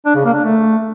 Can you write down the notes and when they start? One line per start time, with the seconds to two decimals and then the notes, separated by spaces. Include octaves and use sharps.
0.05 D4
0.15 C#3
0.25 A#3
0.34 D4
0.44 A3